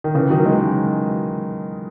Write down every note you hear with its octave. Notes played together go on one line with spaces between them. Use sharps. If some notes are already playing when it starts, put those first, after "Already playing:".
D#3
C#3 E3
D#3 F#3
E3 G#3